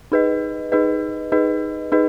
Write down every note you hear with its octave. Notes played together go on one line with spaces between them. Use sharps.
D#4 G#4 B4 D#5
D#4 G#4 B4 D#5
D#4 G#4 B4 D#5
D#4 G#4 B4 D#5